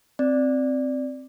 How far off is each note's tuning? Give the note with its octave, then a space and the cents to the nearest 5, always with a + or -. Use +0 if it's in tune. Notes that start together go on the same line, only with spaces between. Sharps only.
C4 +0 D5 +0